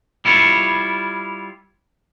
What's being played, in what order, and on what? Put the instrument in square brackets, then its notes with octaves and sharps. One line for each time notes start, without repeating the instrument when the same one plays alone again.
[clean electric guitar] G3 E4 F4 C#5